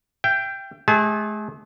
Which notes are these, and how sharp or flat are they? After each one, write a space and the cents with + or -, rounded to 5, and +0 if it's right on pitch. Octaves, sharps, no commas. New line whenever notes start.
E5 +45 G5 +0
A3 -45 G#4 -30 A5 -40